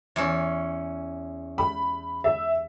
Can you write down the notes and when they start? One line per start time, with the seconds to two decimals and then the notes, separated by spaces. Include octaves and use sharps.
0.16 E2 C#4
1.58 B5
2.24 E5